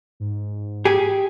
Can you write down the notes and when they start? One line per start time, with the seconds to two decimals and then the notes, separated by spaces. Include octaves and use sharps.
0.20 G#2
0.85 G4 G#4